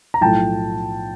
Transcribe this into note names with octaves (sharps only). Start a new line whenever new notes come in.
A#5
B1 A2 F3 A3 G5 A5